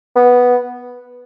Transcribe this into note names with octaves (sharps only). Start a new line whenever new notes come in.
B3